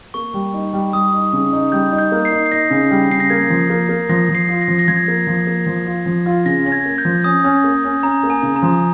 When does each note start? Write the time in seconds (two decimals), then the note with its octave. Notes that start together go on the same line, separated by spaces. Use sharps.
0.14 A#3 C#6
0.34 G3
0.54 D#4
0.73 G3
0.93 G3 D#6
1.13 D#4
1.33 C#3
1.53 D#4
1.72 G3 G6
1.92 D#4
1.98 G6
2.12 A#3
2.25 C7
2.31 D#4
2.46 C7
2.51 D#4 A#6
2.70 C#3
2.91 G3
3.10 C#3 C7
3.20 A#6
3.30 A#3 G#6
3.50 F3
3.70 A#3
3.89 A#3
4.09 F3 A#6
4.29 F3
4.35 C7
4.49 F4
4.62 A#6
4.68 F3
4.79 A#6
4.88 F3 G#6
5.08 A#3
5.27 F3
5.47 A#3
5.66 F3
5.86 F4
6.06 F3
6.26 F4
6.45 C#3 A#6
6.65 C#4 A#6
6.72 G#6
6.85 A#3
6.98 G6
7.05 F3
7.24 C#4 D#6
7.44 C#4
7.64 A#3
7.84 C#4
8.03 C#4 A#5
8.23 A#3
8.30 G#5
8.43 C#3
8.56 A#5
8.63 F3